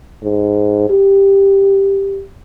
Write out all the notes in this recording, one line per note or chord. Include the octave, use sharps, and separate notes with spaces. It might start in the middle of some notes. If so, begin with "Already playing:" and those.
G#2
G4